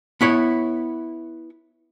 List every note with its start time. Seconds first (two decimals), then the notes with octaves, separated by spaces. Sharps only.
0.21 B3 E4 C#5